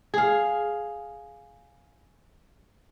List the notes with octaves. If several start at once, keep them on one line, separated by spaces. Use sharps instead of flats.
G#4 F5